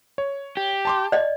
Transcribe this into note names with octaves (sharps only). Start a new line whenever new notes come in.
C#5
G4
A5 C6 D6
D5 D#5